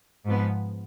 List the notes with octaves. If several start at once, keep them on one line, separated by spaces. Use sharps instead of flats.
G#2 F3 B3